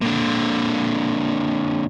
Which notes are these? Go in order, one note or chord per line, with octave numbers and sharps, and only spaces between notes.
A#2 D3